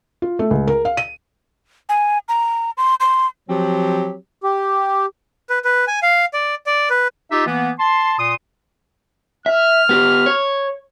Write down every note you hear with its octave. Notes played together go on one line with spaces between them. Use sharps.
F4
A3
C#2
A#4
F5
D#7
G#5
A#5
C6
C6
F3 F#3 C4 F#4 G4
G4
B4
B4
G#5
F5
D5
D5
B4
D#4 F4 G4 D#5 E5
E3 A#3 B3
A5 C6
A#2 C6 D#6
E5 F6
B3 G4
C#5